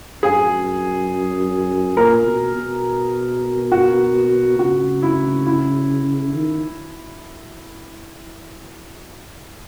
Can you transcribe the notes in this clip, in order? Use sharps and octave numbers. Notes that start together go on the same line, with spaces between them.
F#2 G#4
A#2 A#4
B2
B2
F#4
C#3 F#4
E4
E4
D#3